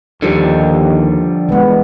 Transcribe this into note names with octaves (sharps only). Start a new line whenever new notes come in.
D#2 D3 F3 G3
E3 G#3 B3